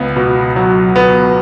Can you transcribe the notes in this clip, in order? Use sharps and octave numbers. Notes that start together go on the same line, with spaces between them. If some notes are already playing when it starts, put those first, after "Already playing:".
Already playing: C#2 B3
B2
F#3
B3